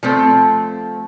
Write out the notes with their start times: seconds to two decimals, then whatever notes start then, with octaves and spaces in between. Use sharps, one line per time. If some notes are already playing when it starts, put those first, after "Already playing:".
0.03 F3 A3 C4